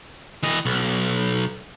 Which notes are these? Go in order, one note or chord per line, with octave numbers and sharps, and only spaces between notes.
E3 D#5
B1